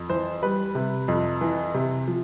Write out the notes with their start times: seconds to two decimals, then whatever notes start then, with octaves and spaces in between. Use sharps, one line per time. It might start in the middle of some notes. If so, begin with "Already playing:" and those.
Already playing: F2
0.10 E3 C5
0.43 G3 B4
0.75 C3
1.08 F2
1.41 E3
1.74 C3
2.08 F3